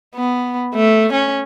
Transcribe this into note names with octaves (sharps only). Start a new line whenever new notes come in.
B3
A3
C#4